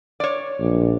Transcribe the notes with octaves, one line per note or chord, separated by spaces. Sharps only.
C#5 D5
A#1